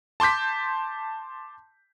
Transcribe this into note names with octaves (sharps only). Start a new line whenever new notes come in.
A5 C6 D6 G6 B6